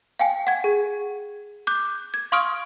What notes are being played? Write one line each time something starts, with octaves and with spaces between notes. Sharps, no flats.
F5 G5 G#5
F#5 G#6
G#4
D6 F#6 G6
G#6
F5 C6 C#6 D#6 F6 D7